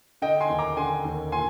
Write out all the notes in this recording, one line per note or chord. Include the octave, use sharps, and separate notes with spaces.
D3 D#5 G5
G#5 C6
D#2
A#5 D6
D3 G#5 C6
D#2
A#2 G#5 C6